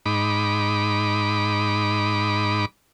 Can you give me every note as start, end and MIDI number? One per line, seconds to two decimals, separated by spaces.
0.06 2.65 44
0.06 2.65 63
0.06 2.65 83
0.06 2.65 86